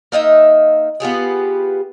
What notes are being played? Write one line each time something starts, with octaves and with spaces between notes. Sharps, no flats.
A#3 D#4 D#5 E5
B3 F4 G4 G#4